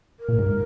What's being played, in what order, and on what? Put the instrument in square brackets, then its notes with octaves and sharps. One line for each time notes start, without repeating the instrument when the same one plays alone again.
[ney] A#4
[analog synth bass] A#2
G#2